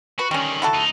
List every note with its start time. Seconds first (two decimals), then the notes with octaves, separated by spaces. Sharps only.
0.19 F#4 B4
0.31 D3 D#3 G3 C#4
0.62 E4 F#4 A4
0.74 C#2 D#4